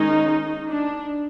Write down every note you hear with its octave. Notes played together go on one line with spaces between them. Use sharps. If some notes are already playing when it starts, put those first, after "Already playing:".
Already playing: D#3 G#3 C#4 D#4
D4